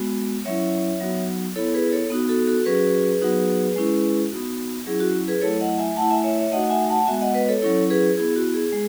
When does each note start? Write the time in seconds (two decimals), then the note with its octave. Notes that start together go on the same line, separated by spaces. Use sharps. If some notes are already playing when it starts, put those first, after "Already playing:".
Already playing: G#3 B3 F#4
0.45 F#3 C#4 E4 C#5 E5
1.00 F#3 B3 D#4 F#4
1.56 B3 E4 A4 C#5
1.74 G#4 B4
1.93 A4 C#5
2.10 B3 D#4 F#4
2.29 F#4 A4
2.47 F#4 A4
2.65 F#3 C#4 F#4 G#4 B4
3.21 F#3 B3 D#4 F#4
3.76 G#3 C#4 E4
4.31 B3 D#4 F#4
4.87 F#3 C#4 E4 G#4
5.00 F#4
5.28 G#4 B4
5.41 F#3 A3 E4 A4 C#5
5.60 D#5 F#5
5.78 E5 G#5
5.96 A3 E4 F#5 A5
6.10 E5 G#5
6.24 C#5 E5
6.38 C#5 E5
6.52 A3 D#4 F#4 D#5 F#5
6.66 F#5
6.70 E5 G#5
6.89 F#5 A5
7.07 G#3 B3 F#4 E5 G#5
7.21 D#5 F#5
7.34 B4 D#5
7.48 A4 C#5
7.62 F#3 C#4 E4 A4 C#5
7.90 G#4 B4
8.17 B3 E4 G#4
8.36 F#4
8.54 G#4
8.72 G#3